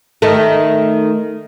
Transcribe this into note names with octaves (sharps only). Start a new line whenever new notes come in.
D#3 A3